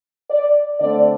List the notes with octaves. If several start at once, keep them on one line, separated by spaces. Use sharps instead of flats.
D5
D3 A3 C4 D5